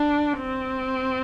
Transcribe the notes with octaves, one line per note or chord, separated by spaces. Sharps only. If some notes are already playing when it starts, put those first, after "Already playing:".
Already playing: D4
C4